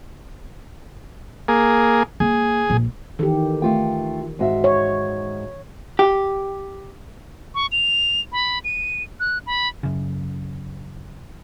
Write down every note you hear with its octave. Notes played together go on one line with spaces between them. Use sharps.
A#3 G#4
A#3 G#4
A#1
D#3 E3 G4 A4
A3 F4 G5
G#2 F#4 E5
C#5
G4
C#6
F7
B5
D#7
F#6
B5
F#2 C#3